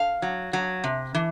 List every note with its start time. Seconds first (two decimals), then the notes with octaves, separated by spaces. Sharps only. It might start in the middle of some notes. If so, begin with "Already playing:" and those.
Already playing: F5
0.22 F#3
0.53 F#3
0.84 C3
1.15 E3